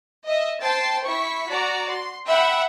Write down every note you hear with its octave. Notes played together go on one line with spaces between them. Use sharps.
D#5 E5
C5 G5 A5 A6 C7
E4 C#6 B6
F#4 D5 A#5
C6
E5 F#5 G5 B5